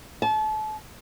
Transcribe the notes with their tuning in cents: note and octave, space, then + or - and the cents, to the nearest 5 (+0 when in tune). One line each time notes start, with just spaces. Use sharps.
A5 -35